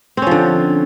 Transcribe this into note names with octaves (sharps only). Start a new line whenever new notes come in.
D3 F3 C4 C#4